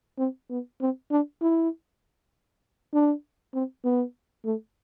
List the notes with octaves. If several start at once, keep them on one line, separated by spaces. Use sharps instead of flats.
C4
B3
C4
D4
E4
D4
C4
B3
A3